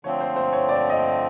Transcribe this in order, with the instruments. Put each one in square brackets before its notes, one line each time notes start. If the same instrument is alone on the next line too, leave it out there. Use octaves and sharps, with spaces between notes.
[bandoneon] D3 F3 A3 C4 [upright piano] C#5
[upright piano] C5
C5
C#5
D5
D#5